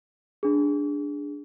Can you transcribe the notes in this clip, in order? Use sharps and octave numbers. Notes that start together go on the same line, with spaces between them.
D4 G#4